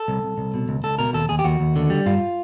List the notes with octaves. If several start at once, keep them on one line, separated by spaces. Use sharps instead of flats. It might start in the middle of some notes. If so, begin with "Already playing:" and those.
Already playing: A4
C2
C2
C2
B2
C#2
C#2 A4
B2 A#4
D#2 A4
D#2 G#4
G4
D#2 F#4
D#2
D3
G3
G2 F4